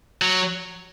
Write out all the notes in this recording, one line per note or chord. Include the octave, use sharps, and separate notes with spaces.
F#3